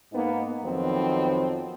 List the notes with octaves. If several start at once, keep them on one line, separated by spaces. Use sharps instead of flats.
G#2 A#3 B3 D#4
F2 D#3 F3 F#3 B3 C4